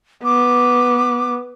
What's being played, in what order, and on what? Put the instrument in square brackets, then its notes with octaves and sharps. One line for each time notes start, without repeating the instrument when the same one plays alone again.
[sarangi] B3 [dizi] D6